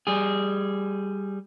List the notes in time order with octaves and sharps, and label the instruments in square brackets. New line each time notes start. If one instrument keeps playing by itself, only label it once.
[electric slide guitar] G3 G#4